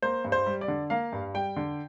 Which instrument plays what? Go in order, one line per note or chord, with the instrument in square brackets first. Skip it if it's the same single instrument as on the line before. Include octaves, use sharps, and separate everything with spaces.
[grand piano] A#3 C5
G2
C5
G3
D5
D3
A#3 F5
G2
G3 G5
D3